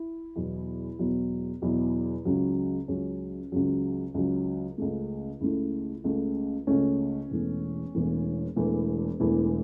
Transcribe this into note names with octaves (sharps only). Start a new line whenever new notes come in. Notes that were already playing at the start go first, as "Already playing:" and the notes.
Already playing: E4
E2 B2 F#3
E2 B2 F#3
E2 B2 F#3 E4
C#2 C#3 F#3
C#2 C#3 F#3 C#4
C#2 C#3 F#3
C#2 C#3 F#3
C#2 C#3 A3
C#2 C#3 A3 E4
C#2 C#3 A3
C#2 C#3 A3 C#4
E1 E2 E3 A3
E1 E2 E3 A3
E1 E2 E3 A3
E1 E2 E3 A3 E4